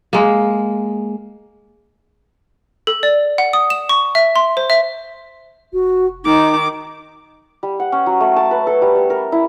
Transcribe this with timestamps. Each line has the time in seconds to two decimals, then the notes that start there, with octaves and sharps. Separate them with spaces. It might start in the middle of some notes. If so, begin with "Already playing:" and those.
0.13 G#3 A#3
2.87 A4
3.03 D5
3.38 F#5
3.53 D#6
3.70 E7
3.89 C#6
4.15 E5
4.36 C6
4.57 C5
4.70 E5
5.73 F1 F#4
6.24 D#3 D#4 D6
7.63 G3
7.80 F#5
7.92 C#4
8.06 F#3
8.21 A3
8.36 A5
8.51 B4
8.67 A4
8.82 G3
8.95 G3
9.10 A#4
9.32 E4